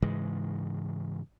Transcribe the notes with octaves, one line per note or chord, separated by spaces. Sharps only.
G#2 C#3 E3 G#3